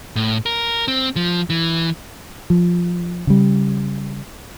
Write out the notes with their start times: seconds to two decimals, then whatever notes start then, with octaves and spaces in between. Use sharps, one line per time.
0.16 A2
0.46 A#4
0.88 C4
1.16 F3
1.50 E3
2.50 F3
3.27 C#3 G3